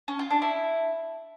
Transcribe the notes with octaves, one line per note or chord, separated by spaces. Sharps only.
C#4
F4
D4
E4